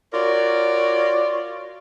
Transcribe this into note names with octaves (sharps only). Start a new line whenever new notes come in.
F4 F#4 A#4 C#5 D5